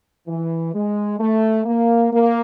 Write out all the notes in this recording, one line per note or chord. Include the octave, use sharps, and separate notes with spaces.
E3
G#3
A3
A#3
A#3